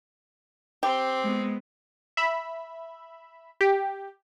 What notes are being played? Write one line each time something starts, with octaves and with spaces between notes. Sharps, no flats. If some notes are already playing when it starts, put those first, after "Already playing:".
C4 G4
G#3 B3
E5 B5
G4